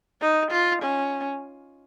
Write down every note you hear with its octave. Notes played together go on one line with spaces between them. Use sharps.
D#4
F4
C#4